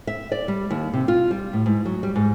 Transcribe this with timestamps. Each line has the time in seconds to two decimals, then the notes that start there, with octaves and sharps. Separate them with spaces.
0.07 E5
0.32 D5
0.48 G3
0.70 D#2
0.93 C3
1.08 F4
1.31 G3
1.53 A2
1.66 G#2
1.85 F#3
2.03 G3
2.16 G#2